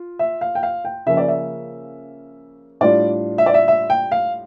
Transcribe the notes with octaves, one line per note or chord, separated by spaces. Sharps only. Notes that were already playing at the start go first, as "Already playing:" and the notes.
Already playing: F4
E5
F5
G5
F5
G5
C#3 F3 A#3 C#4 E5
D5
E5
A2 G3 D4 F4 D5
E5
D5
E5
E5
G5
F5